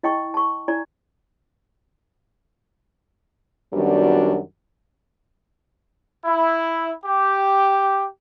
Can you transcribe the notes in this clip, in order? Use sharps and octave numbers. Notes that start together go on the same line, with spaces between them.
E4 D#5 G5 A5 C#6
A5 C#6
E4 D5 G#5 A#5
F#2 D#3 G3 B3 D4 F#4
E4
G4